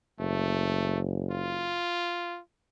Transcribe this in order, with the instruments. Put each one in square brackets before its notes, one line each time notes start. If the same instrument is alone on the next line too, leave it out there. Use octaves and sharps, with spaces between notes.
[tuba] F#1 [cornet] A3
[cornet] F4